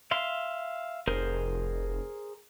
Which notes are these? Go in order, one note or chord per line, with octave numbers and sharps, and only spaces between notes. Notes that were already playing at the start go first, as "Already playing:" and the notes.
E5 F5 C6
F1 G#4 A#4 C5